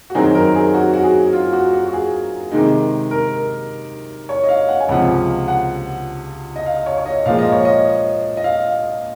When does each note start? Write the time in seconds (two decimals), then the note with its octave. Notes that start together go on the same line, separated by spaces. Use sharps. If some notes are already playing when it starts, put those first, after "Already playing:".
0.10 F#4
0.15 F#2 D#3 F#3 C4 D#4 G#4
0.35 A#4
0.55 G#4
0.74 F#4
0.93 F#4
1.03 G#4
1.33 F4
1.53 F#4
1.73 F#4
1.88 F#4
1.93 G#4
2.52 C3 D#3 G#3 D#4
3.11 A#4
4.29 C#5
4.44 D#5
4.49 F5
4.68 F#5
4.80 G#5
4.89 C#2 C3 F3 F#5
5.48 F#5
6.56 D#5
6.66 F5
6.86 C#5
6.98 C#5
7.06 D#5
7.26 A#2 F3 G#3 F5
7.39 D#5
7.52 C#5
7.65 D#5
8.37 D#5
8.44 F5